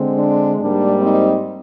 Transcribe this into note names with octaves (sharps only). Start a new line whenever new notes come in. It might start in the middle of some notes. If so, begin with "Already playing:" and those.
Already playing: D3 G#3 C4
D4
G#2 G3 A#3 D4
C4 D#4